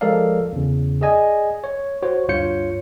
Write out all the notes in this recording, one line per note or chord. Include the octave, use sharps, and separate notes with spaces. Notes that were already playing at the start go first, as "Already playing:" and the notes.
F3 G#3 A4 A#4 D5 F5
E2 C#3
G#4 D5 D#5 G#5
C#5
F#4 C5 C#5
D2 G2 F4 C#5 G6 C#7